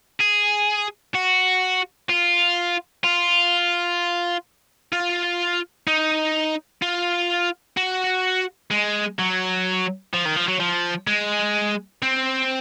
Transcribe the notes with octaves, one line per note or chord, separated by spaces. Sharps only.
G#4
F#4
F4
F4
F4
D#4
F4
F#4
G#3
F#3
F3
D#3
F3
F#3
F3
G#3
C4